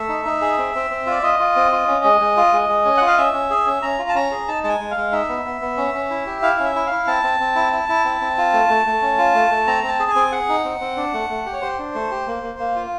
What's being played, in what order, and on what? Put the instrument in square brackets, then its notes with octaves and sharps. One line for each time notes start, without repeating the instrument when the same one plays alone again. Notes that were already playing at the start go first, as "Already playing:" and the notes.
Already playing: [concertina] A3 E5
D#4
D#4
G#4
C4
C4
C4
F4 D5
F4 D#5
F4
C4
F4
C#4
G#3
G#3
F4
G#3
G#3
C#4
F4 F#5
F5
C#4 E5
C#4
G#4
C#4
C#4 A#5
F4
A5
C#4 A#5
G#4
D#4 A5
G#3 A5
G#5
G#3
F5
G#3
D#4 E5
B3
B3
B3
C#4
C#4
E4
G4
E4 F5
C#4
E5
E4
F5
E4
C4 A5
C4
C4
E4
E4
E4
C4
C4
F4
A3
A3
A3
C#4
F4
A3
A3
C4 A#5
C4 A5
G#4
G#5
C4
G#4 F#5
D#4
C4
C4
D4
A3
A3
G4
C#5
G4 C5
D4
A3
G4
A#3
A#3
A#3
F4